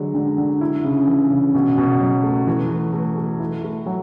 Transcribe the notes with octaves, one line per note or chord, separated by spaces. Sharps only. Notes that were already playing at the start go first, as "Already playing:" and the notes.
Already playing: D3 F#3 G#3
D3
D3
E4
C#3
E3
C#3
B2
B2
F#3
A3
E3
A3
A3
A3
E4
A3
F#3